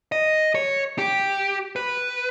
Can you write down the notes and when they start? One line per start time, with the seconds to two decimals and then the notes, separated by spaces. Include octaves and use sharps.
0.12 D#5
0.55 C#5
0.98 G4
1.76 B4